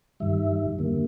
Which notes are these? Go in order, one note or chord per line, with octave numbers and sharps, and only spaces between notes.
G2 D#3 G3 E5
F2 D3 G3 A#3